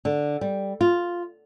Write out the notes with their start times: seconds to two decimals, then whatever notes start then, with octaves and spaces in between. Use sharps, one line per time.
0.05 D3
0.41 G3
0.81 F4